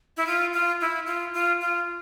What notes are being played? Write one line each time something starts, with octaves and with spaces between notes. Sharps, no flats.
E4
F4
F4
E4
F4
F4
F4